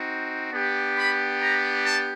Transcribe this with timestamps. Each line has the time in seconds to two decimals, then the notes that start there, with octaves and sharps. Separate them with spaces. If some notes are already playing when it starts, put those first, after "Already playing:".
Already playing: C4 D#4 F#4
0.53 B3 D4 G4
0.97 B5
1.42 A#5
1.85 A5